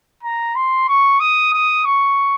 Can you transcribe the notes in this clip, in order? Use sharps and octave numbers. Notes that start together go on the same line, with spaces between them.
A#5
C6
C#6
D#6
D#6
C#6